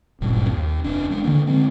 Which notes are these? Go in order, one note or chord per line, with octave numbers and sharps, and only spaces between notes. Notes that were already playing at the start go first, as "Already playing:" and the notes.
D1 G#1 G2 A#2
D#2
F1 D4
G#3 D4
D3 F3 A#3 D4
D3 G#3 C4